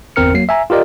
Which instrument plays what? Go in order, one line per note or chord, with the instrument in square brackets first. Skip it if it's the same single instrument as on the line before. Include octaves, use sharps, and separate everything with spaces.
[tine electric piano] G1 E2 C4 A#4 F6 C#7
F#3 A#3 C7
E5 G#5 A#5
F4 G4 A#4 D5 D#5